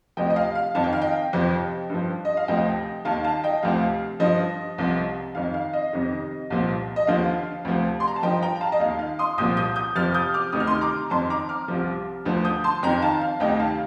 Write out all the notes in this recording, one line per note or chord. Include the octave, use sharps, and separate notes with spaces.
D2 C3 F3 D#5 G5
D#5
F5
F5
F2 D#3 A5
G5
F5
D#5 G5
F2 C3 F3
G2 F3
D#5
F5
D2 C3 F3 D#5 G5
D#2 D#3 F5 A5
F5 A5
D#5 G5
D2 C3 F3 F5
G2 F3 D#5
C2 C3 F3
F2 D#3 F5
F5
D#5
F2 C3 D#3
C2 A#2 F3
D#5
D#2 D3 F3 F5
D2 C3 F3
C6
A#5
A5
G2 F3 D#5 G5
G5 A#5
A#5
F5 A5
D#5
D#2 D#3 F5
F5
C6 D#6
C2 A#2 F3 D#6 G6
D#6 G6
D#6 G6
F2 C3 F3 F6 A6
D#6 G6
D6 F6
D2 C3 D#3 D#6
F6
C6 D#6
A#5 D6
F2 D#3 A5 C6
A#5 D6
D6 F6
C2 C3 F3
D2 D3 F3
D#6 G6
A5 C6
F2 D#3 G5 A#5
F5 A5
F5
D2 C3 D#3 D#5 G5
F5 A5